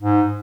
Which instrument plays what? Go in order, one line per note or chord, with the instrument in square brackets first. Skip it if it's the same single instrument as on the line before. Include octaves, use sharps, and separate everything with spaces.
[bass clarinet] G#2